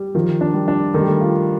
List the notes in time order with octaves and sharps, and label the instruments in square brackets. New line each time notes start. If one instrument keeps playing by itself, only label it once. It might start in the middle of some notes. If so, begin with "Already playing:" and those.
Already playing: [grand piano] G3
[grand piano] D#3 [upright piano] F3
[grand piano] D4
[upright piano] G3
[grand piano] D4
[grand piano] D#3 [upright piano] A3
[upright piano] G3
A3
[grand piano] F4